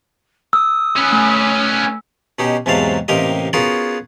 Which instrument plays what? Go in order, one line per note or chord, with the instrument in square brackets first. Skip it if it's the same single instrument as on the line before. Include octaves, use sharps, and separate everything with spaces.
[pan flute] D#6 [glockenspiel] E6
[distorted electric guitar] C#4 B4
[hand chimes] A3 G#5
[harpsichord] B2 C#4 D#4 G4
E2 G#2 C3 F#3 F5 A5
A1 C3 A#3 G4 A#4 D#5
B3 C#4 F4 F#4 G#4 A#4